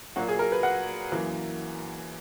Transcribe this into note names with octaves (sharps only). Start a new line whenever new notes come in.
A#2 F#3 A#3 F#4
G#4
A#4
B4
F#5
F#2 E3 A#3